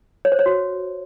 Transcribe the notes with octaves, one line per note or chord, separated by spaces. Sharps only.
C#5
C5
C#5
F#4